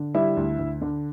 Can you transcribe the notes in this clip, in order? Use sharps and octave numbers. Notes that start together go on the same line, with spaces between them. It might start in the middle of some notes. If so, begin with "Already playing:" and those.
Already playing: D3
G3 E4 E5
D2
D2
D3